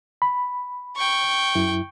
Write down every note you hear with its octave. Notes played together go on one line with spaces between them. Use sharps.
B5
G5 C#6
F#2 E4